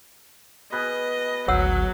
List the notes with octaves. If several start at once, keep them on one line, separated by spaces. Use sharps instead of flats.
B2 G#4 B4 D#5
G#1 D2 F#3 C#5 F#5 E6